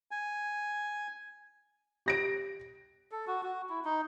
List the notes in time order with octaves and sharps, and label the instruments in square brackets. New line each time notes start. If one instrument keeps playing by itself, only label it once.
[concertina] G#5
[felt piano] G4 A#6 D7
[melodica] A4
F#4
F#4
E4
D#4